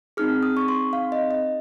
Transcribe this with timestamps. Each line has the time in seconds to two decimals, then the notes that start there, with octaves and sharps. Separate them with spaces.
0.17 C4 D#4 G#4 F6
0.43 D#6
0.57 C#6
0.68 C6
0.93 F5
1.12 D#5
1.31 D#5